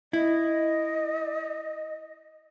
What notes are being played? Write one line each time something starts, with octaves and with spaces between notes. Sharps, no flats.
E4 D#5